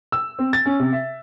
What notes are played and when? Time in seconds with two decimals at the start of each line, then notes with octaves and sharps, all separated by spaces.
0.12 E6
0.39 C4
0.53 A6
0.66 C#4
0.79 C3
0.93 E5